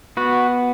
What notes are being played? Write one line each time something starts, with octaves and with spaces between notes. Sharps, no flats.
B3 F#4